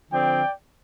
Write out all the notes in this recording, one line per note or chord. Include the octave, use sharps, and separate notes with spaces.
D3 F3 C4 D5 G5